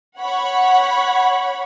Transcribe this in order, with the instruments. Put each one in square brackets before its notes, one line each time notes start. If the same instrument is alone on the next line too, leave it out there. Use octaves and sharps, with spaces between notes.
[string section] C#5 F#5 B5